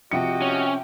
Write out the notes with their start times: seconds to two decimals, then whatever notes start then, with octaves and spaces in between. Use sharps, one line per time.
0.11 C3 F3 F#4 G4 D#5 G5 C#7
0.42 C#4